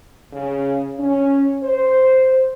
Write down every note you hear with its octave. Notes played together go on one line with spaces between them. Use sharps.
C#3
C#4
C5